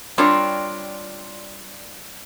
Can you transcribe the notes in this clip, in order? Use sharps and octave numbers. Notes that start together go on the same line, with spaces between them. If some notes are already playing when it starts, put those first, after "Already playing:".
G3 C4 D4 F4 A#4 C#5